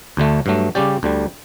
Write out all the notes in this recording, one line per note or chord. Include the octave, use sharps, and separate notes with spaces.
D2 D3 A3
G2 F#3 A3
C#3 G3 C#4 G4 D5
D2 D3 G3